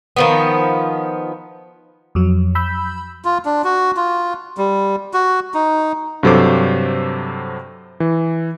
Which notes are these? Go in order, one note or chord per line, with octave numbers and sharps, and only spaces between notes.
D#3 F3 B3
F2 F#3
B5 E6 G6
F4
D4
F#4
F4
G3
F#4
D#4
G2 C3 F#3 A4 C5 D6
E3